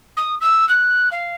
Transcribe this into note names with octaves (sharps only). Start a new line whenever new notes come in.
D#6
E6
F#6
F5